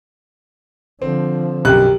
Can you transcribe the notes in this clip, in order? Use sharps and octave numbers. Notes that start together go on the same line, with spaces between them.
D3 F3 C4
B1 F#2 G4 G5 F#6